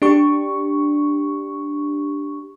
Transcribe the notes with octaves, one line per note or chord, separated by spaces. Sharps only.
D4 G4 C#6